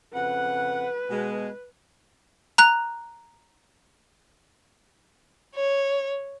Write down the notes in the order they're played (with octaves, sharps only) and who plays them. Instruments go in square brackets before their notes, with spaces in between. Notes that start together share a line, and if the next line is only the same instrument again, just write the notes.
[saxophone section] F2 C#3 F#5 [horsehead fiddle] B4
[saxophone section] B2 G#3
[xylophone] A#5 F#6 F7
[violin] C#5